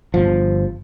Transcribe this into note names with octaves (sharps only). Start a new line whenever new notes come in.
G1 F3